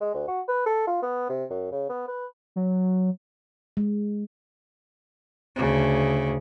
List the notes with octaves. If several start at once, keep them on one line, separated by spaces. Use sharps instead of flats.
G#3
D2
F#4
B4
A4
F4
B3
C3
F#2
C#3
B3
B4
F#3
G#3
D2 C#3